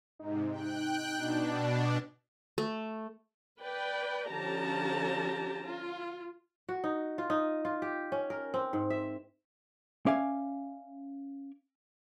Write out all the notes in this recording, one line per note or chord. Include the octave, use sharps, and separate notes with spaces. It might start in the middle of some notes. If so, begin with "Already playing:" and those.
G#2 C3 D#4
G5 F#6
B2 D4
A3
B4 D5 G5
D3 F3 C#4 G4 A5 A#5
F4
F#4
D#4
F4
D#4
F4
G4
C#4
A#4
C4
G#2
E5
C#4 D5 E5 F5 G#5